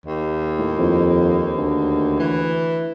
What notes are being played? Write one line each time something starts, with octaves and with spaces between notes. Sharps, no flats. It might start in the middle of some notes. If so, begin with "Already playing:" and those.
D#2
A2
F2
D2
E3